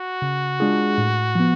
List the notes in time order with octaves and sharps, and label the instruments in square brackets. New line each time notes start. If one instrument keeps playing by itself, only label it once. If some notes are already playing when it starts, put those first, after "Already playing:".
Already playing: [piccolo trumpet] F#4
[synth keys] C#3
G#3 D4 F4 G#4
A2
F3 B3